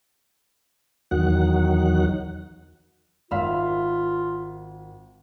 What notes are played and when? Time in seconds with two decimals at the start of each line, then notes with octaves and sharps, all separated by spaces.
1.11 E2 D#3 F#3 F#5
3.31 G#1 D#3 F4 E5 F5 B5